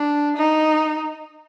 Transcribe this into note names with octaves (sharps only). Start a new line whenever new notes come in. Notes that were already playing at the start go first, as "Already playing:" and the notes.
Already playing: D4
D#4